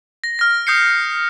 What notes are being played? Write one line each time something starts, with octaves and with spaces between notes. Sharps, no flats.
A#6
F6 A#6
D#6 G6 C7 C#7